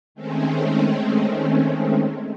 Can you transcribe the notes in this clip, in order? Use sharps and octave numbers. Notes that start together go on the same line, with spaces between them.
D#3 G#3 A3 C4 C#4